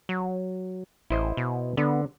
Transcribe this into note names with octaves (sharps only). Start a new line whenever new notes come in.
F#3
A1 E4 C5 D#5
B2
D3 B3